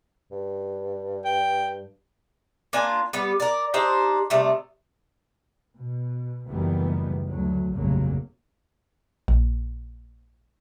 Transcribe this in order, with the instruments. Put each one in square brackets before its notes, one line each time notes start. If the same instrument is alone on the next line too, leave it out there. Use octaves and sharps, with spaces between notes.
[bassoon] G2
[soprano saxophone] G5
[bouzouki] A#3 D4 F4 G#5
G3 B3 B4
A#4 D5
D4 D#4 G4 C5
C3 D#3 G3 A3
[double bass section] B2
F#1 D2 D#3 E3 G3 B3
D2 F#3
F1 A#1 G2 C#3 F#3 A#3
[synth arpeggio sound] A#1